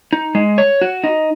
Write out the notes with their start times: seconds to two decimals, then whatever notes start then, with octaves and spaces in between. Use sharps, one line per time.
0.13 D#4
0.35 G#3
0.58 C#5
0.81 F#4
1.04 D#4